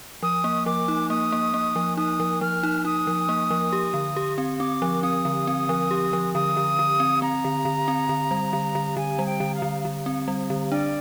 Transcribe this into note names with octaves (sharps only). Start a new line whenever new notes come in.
F3 D#6
A#3
F3 D6
D#4
A#3 D#6
A#3
A#3
F3
D#4 D#6
F3
F3 F6
D#4
D#4 D#6
F3
A#3
F3
G4
D3
G4
C4
C4 D6
F3
C4 D#6
D3
C4
F3
G4
F3
D3 D#6
D3
D3
C4
C4 A#5
D3
D3
C4
D3
G3
D3
D3
D3 G#5
G3
G5
D3
F5
D3
D3
C4
G3
D3
D4 D5